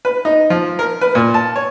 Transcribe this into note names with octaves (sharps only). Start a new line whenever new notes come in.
B4
D#4
F3
A#4
B4
A#2
A5
C#5